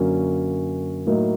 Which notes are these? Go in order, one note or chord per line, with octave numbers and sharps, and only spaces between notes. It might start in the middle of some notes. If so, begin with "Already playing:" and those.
Already playing: F#2 D3 F#3 A#3 C#4
A2 F#3 A#3 D#4